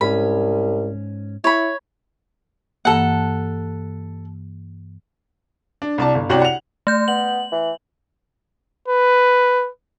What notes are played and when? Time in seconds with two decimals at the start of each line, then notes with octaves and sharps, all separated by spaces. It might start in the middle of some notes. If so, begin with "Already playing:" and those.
0.01 C2 G#2 C#4 B5
1.44 E4 C#5 B5
2.85 G2 E3 A#3 A4 F#5
5.82 D4
5.98 C2 D5 A5
6.15 G1
6.29 C2 F#4 C#5 D5 G5 F#7
6.42 F#5 F7
6.87 A3 G6
7.08 B3 F#7
7.52 E3
8.88 B4